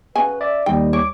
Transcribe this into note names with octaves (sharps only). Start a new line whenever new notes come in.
C#3 F#3 B4 G#5
D5 E5
D#2 G3 D#4 D#5 G5
C#5 D6